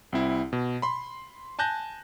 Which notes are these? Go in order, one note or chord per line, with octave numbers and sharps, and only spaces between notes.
C2 C4 E4
B2
B5 C6
G#5 A5 F#6 G6 A#6